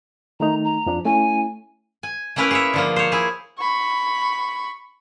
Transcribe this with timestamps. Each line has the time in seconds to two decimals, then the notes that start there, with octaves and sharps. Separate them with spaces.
0.40 D#3 A3 D#4 A#5
0.64 A#5
0.86 F2 F3 D4
1.05 A3 C#4 E4 G#5
2.03 G#5
2.36 A3 A#3 C#4 E4 A#4 B4
2.51 G#4 C#5 E5
2.74 D3 F3 A#3
2.96 C5 C#5
3.12 E4 G#4
3.59 B5 C#6